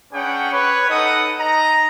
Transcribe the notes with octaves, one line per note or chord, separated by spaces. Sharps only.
C#4 D4 G#4 B4 F#5 G5
B4 C#5
D#4 A4 B4 D#5 F#5 D#6
D#4 D#5 A#5